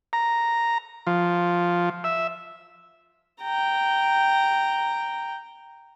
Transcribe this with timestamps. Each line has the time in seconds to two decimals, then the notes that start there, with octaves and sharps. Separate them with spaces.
0.13 A#5
1.07 F3
2.04 E5
3.41 G5 A#5